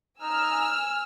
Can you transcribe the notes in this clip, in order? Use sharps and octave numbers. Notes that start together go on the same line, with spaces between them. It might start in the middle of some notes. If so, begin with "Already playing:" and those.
D#4 G#5 E6 F6